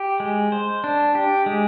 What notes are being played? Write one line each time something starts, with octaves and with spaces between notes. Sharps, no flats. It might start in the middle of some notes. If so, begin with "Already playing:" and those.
Already playing: G4
G#3
C5
D4
G4
G#3